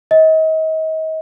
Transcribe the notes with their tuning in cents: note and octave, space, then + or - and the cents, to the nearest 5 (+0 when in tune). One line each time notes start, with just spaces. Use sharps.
D#5 +35